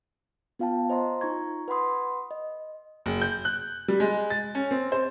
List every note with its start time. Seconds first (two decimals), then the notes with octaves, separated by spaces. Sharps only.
0.59 B3 F4 F5 G5 A5
0.90 C5 D#5 A#5 C6
1.21 D#4 F4 A#5 C#6 G#6
1.68 B4 F#5 B5 C6 D#6
2.31 D#5
3.06 F#1
3.22 G6
3.45 F#6
3.88 G3
4.00 G#3
4.30 A6
4.55 C#4
4.71 C4
4.92 C5